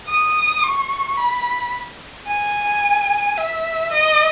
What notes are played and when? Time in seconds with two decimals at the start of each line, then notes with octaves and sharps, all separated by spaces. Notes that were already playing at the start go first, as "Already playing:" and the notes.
0.08 D#6
0.63 C#6
1.17 B5
2.28 G#5
3.37 E5
3.92 D#5